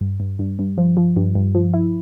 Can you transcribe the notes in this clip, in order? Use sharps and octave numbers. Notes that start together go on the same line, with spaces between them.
G2
G2
G2
G2
F3
F3
G2
G2
F3
E4